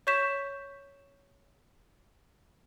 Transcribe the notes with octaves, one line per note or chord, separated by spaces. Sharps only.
C#5 C#6 G6 B6 E7